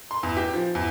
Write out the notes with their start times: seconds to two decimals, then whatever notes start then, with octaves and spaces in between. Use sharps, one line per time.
0.11 C6
0.23 E2
0.37 G4
0.54 F3
0.75 E2